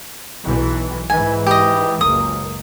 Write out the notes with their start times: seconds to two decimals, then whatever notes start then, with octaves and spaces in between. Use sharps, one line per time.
0.43 B1 E3
1.10 G#2 E3 G#5
1.47 G4 D#5
2.01 F#1 C#2 A#3 D#6